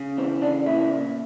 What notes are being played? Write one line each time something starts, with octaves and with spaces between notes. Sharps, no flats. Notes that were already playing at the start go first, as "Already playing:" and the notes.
Already playing: C#3
E3 C4
C#3 D4
A#2 E4
A#2